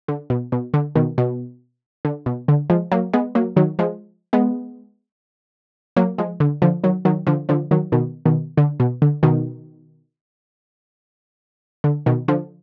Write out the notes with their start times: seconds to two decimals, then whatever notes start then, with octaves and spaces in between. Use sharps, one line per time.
0.08 D3
0.30 B2
0.52 B2
0.74 D3
0.95 B2 D#3
1.18 B2
2.05 D3
2.26 B2
2.48 D3
2.70 F3 G#3
2.91 F#3 A#3
3.13 G#3 B3
3.35 F#3 A#3
3.56 D#3 F#3
3.79 F3 G#3
4.33 G#3 B3
5.96 F#3 A#3
6.18 F3 G#3
6.40 D3
6.62 D3 F3
6.84 D#3 F#3
7.05 D#3 F#3
7.27 D3 F3
7.49 D3 F3
7.71 D#3 F#3
7.92 B2 D#3
8.25 B2 D#3
8.57 D3
8.80 B2
9.02 D3
9.23 B2 D#3
11.84 D3
12.06 B2 D#3
12.28 D3 F3